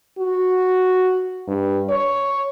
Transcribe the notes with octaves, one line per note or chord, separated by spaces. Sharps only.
F#4
G2
C#5